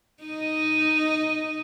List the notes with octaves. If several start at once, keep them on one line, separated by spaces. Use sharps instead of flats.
D#4 D#5